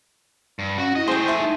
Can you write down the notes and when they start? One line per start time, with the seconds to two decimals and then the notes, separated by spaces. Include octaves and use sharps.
0.59 G2
0.78 C#4 F#4
0.96 E4 D#5
1.08 A3 G#4 C5 G5
1.28 E5 A5
1.42 D#4